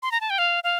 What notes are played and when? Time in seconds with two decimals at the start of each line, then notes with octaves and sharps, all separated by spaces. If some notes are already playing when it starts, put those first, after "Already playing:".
0.03 C6
0.12 A#5
0.21 A5
0.30 G5
0.38 F5
0.64 F5